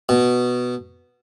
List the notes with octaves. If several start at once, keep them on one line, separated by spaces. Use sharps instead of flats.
B2